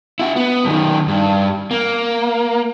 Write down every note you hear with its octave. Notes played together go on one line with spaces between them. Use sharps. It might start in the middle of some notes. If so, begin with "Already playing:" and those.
E4 F#4
B3
F#2 D#3
G2
A#3